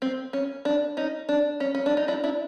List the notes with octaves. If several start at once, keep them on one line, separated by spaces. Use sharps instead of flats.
C4
C#4
D4
C#4 D#4
D4
C#4
C#4
D4
D#4
D4 E4
D4 E4